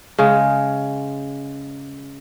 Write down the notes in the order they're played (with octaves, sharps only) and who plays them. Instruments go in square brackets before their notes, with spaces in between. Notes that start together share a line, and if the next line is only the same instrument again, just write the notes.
[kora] C#3 G#3